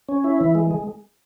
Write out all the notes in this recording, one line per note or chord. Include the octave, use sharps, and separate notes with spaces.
C#4
E4
E3
G#3
G#3